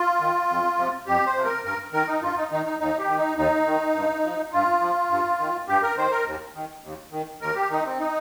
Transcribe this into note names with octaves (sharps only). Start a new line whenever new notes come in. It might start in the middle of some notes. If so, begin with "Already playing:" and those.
Already playing: F4
D#3
F2
C3 F3
F2 G4
C5
C3 F3
A#4
G2 A#4
D#3 A#4
D#4
G2 F4
D#4
D#3 D#4
D#4
D#2 D#4
G4
D#3
D#4
D#2 D#4
D#3
G2
F3
G2 F4
F3
G2
D#3
G2 G4
A#4
D#3 C5
A#4
D#2
D#3
D#2
D#3
D#2 A#4
G4
D#3 D#4
C4
D#4